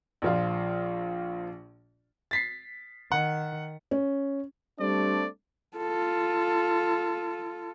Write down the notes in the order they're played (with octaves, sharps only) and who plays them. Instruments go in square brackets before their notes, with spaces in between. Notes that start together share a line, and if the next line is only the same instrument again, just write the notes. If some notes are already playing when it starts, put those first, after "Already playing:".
[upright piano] A#1 F3 F4
[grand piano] A6 B6 C7
[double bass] D#3 [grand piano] F#5
[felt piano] C#4
[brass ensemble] G3 A3 C4 D4 D5
[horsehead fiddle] F4 A4